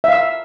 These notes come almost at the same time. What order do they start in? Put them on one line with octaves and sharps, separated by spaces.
E5 F5 E6